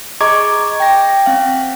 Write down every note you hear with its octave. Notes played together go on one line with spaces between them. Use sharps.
G#4 D#5 A#5 C#6 D6 G#6
G5 A#6
C4 F5